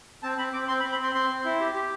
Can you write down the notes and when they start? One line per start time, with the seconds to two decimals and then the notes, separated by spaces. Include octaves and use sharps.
0.23 C4 A5
0.38 C4 B5
0.53 C4 D6
0.68 C4 C6
0.80 B5
0.84 C4
0.92 B5
0.99 C4 C6
1.14 C4 C6
1.30 C4
1.45 E4
1.60 G4
1.75 G4